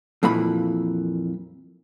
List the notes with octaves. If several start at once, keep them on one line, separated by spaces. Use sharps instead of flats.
F2 A#2 E3 B5